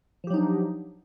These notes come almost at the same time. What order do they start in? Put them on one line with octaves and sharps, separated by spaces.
F3 G4 F#3 D#4 D4